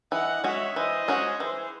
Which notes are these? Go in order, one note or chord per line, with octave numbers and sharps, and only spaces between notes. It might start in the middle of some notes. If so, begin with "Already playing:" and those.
E3 D#5 F#5
G#3 C#4 F#4 C#5 E5
E3 C5 D#5
G#3 C#4 F#4
E3 G#4 C5